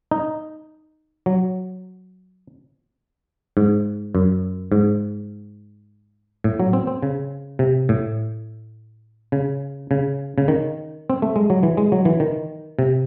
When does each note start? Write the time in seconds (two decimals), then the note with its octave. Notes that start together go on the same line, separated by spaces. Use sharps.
0.11 D#4
1.26 F#3
3.57 G#2
4.15 F#2
4.72 G#2
6.44 A2
6.60 F#3
6.73 C4
6.87 C4
7.03 C#3
7.59 C3
7.89 A2
9.32 C#3
9.91 C#3
10.38 C#3
10.48 D#3
11.10 C4
11.22 A3
11.36 G#3
11.50 F#3
11.63 E3
11.77 G#3
11.92 F#3
12.05 E3
12.20 D#3
12.79 C3